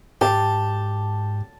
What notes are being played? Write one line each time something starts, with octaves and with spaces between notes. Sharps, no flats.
G#2 G4 A5